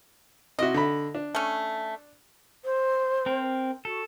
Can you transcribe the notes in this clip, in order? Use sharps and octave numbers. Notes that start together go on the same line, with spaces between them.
C3 E4 F#4 D#5
D3 B5
D4
A3 C#4
C5
C4 A#4
F#4 A4